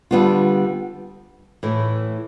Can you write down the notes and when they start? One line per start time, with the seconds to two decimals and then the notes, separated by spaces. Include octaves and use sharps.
0.11 D3 G3 B3 D4 F4
1.63 A2 E3 A3